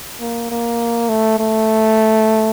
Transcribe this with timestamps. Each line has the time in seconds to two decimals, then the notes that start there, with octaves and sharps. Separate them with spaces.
0.21 A#3
0.50 A#3
1.09 A3
1.39 A3